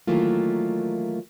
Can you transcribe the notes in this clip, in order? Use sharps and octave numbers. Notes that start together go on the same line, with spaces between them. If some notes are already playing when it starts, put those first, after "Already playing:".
D#3 E3 F#3 A3 A#3 F4